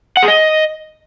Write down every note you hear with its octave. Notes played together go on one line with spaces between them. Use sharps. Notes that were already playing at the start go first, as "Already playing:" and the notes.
F#5
G#4
D#5